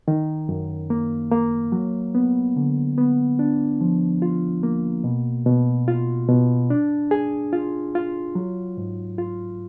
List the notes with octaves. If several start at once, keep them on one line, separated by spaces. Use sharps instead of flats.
D#3
F#2
A#3
A#3
F#3
B3
D3
B3
D4
F3
F4
A#3
B2
B2
F4
B2
D4
G#4
F4
F4
F#3
G#2
F4